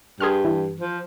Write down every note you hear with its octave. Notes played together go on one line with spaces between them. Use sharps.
G2 G#4 C6 F6
E3
F3